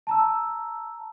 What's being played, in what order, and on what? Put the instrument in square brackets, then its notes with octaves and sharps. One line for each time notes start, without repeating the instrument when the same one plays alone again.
[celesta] A5 A#5 E6